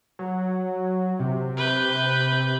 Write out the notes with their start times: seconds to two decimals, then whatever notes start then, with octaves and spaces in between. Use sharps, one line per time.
0.19 F#3
1.19 C3
1.57 B4 G6